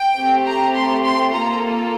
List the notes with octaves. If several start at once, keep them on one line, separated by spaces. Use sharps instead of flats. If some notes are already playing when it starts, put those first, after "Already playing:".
Already playing: G5
A3 C4 G4
A#5
C6
C6
A#3 F4 A4 A#5